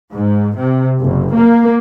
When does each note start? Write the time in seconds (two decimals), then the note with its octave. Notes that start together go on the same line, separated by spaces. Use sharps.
0.13 G#2
0.57 C3
1.01 F#1
1.36 A#3